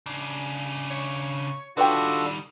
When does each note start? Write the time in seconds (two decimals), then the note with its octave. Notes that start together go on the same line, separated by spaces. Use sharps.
0.06 C#3 D4
0.91 C#5
1.77 D#3 G3 D4 F4 F#4 A4 B4 G5